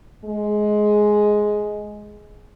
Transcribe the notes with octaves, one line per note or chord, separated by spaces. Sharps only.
G#3